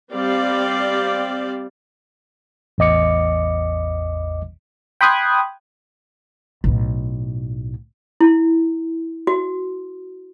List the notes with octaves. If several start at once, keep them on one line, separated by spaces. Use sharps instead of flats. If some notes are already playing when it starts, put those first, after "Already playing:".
G3 C4 G4 D5 F5
A1 E2 D#5 D6 C#7
G5 B5 C6 D#6 F#6 G#6
B1 A2
E4
F#4